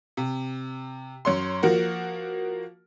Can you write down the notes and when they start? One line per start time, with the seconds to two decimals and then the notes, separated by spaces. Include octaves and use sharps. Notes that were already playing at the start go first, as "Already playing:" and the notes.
0.17 C3
1.25 F#2 C#5 C6
1.63 F3 A#3 F#4 A#4